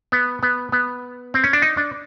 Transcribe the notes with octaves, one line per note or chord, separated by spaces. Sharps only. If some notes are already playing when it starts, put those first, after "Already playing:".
B3
B3
B3
C4
C#4
D4
D#4
D4